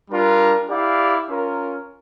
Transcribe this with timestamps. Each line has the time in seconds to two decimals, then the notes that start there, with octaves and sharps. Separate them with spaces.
0.10 G3 D4 F4 A#4
0.69 E4 G4 D5 F5
1.29 C#4 F4 A#4